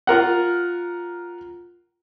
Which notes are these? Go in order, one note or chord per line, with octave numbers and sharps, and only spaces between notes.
F4 A#4 F#5